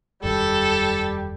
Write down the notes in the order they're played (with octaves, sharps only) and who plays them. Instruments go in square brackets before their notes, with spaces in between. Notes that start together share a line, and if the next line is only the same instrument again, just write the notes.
[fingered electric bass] E1 F#2 D#3 [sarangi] G3 [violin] A4